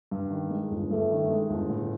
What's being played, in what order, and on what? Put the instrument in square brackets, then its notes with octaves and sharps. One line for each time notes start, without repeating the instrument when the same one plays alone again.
[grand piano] G2
D#3
G#3
G1
[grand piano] G2 [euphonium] A3
[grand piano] D#3
G#3
G1
A2